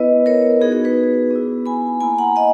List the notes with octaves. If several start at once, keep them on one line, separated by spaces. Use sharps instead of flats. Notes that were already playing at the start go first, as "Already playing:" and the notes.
Already playing: B3 E4 B4 D#5
A#4 C#5
B3 D#4 F#4 G#4
G#4
G#4 B4
B3 E4
G#5 B5
A#3 E4 G#5 B5
F#5 A#5
D#5 F#5